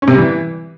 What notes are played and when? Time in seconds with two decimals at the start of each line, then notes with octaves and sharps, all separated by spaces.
0.02 C#4
0.08 C3
0.13 G3
0.18 E3